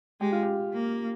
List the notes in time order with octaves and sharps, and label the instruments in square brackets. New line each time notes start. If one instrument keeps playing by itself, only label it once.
[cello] G#3 [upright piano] G4
[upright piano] F4
G4
[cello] A#3